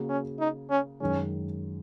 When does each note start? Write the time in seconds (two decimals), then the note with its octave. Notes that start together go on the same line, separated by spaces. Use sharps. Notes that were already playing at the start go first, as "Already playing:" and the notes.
Already playing: C#3 A#3 F#4
0.09 C#4
0.39 D#4
0.70 C#4
1.00 F#2 D#3 G#3 C#4